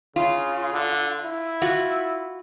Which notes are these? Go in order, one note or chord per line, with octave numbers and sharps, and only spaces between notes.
C#3 F4
D3
E4
F4 F#4